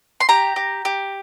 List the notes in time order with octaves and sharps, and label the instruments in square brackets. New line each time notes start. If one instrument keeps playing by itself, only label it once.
[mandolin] C6
G4 A#5
G4
G4